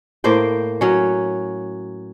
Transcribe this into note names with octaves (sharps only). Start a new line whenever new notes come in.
A2 A#3 C5 G5
F#3 C#4